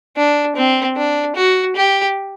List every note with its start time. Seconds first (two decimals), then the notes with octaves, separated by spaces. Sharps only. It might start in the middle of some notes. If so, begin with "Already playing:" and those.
0.17 D4
0.56 C4
0.96 D4
1.36 F#4
1.76 G4